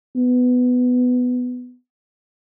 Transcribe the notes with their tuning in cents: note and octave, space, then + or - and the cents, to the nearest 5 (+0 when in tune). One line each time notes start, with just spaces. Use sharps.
B3 +10